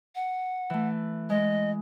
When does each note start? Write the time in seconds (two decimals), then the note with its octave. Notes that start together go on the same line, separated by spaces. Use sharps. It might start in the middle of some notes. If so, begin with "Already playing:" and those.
0.15 F#5
0.70 E3 A3
1.30 G#3 D#5